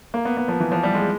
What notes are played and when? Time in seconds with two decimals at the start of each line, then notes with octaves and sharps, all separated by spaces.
0.14 A#3
0.25 B3
0.37 B3
0.48 F3
0.60 E3
0.72 F3
0.83 G3
0.95 G#3